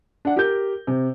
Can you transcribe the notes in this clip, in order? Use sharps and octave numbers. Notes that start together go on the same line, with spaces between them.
D4 F#5
G4 A#4 G6
C3